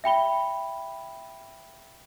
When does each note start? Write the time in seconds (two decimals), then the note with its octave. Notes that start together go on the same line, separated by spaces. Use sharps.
0.04 E5 G5 B5 G7